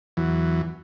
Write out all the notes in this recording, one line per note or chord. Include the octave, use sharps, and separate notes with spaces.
E2 E3 F#3